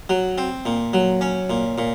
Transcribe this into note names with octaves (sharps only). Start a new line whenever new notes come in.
F#3
C4
A#2
F#3
C#4
A#2
A#2